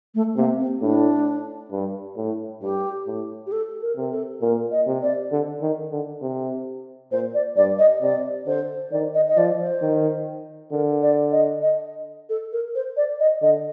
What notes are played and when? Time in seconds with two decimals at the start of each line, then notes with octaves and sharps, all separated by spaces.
0.15 A3
0.36 C3 A#3
0.59 C4
0.82 A2 D4
1.72 G2
2.17 A2
2.62 G2 G4
3.07 A2
3.47 G4
3.52 A4
3.82 A#4
3.97 C3
4.12 A4
4.41 A#2 A#4
4.71 D#5
4.87 C3
5.02 D5
5.32 D3
5.62 D#3
5.92 D3
6.22 C3
7.12 A#2 C5
7.34 D5
7.57 G2 D5
7.79 D#5
8.02 C3 D5
8.46 D3 C5
8.92 D#3 D5
9.14 D#5
9.28 D#5
9.37 F3 D5
9.60 C5
9.81 D#3
10.72 D3 A#4
11.02 D5
11.32 D#5
11.62 D#5
12.29 A4
12.53 A#4
12.75 C5
12.97 D5
13.20 D#5
13.42 D3 D#5